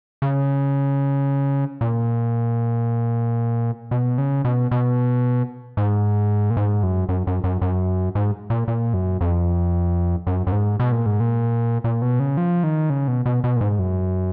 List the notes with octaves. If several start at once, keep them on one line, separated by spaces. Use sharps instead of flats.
C#3
A#2
B2
C#3
B2
B2
G#2
A#2
G#2
F#2
F#2
F#2
F#2
F#2
G#2
A#2
A#2
F#2
F2
F#2
F#2
G#2
B2
A#2
G#2
A#2
A#2
B2
C#3
F3
D#3
C#3
B2
B2
B2
A#2
G#2
F#2